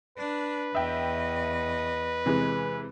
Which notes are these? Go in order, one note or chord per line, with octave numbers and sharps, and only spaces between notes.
D4 B4
E2 D#5 E5 G5
C3 E3 G#3